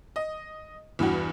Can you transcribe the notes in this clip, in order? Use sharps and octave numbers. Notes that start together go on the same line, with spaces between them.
D#5
E2 G2 E3 F#4